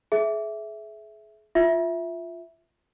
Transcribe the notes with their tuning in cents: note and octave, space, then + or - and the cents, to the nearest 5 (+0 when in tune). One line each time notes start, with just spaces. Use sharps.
G#4 +35 E5 +0
F4 +0 E5 +0